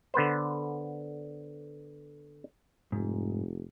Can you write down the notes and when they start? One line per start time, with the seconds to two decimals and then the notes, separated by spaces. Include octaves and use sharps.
0.14 D3 B3 B4 C5
2.92 F1 G#2